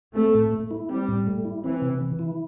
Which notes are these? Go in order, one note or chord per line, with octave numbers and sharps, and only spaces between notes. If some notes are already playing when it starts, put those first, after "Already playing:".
A3 C4
A2
A3
E4
G3 C4
A2
A3
E4
E3 C4
C3
E3
E4